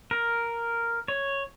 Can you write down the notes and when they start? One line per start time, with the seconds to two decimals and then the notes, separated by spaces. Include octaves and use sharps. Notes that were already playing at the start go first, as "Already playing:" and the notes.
0.11 A#4
1.08 C#5